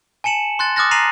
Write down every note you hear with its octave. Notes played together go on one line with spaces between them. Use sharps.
G#5 A5 C#7 E7 F#7
C6 F#6 A6
D6 D#6 F6 F#6 A6 A#6
A#5 A#6 C7 D#7 F7 F#7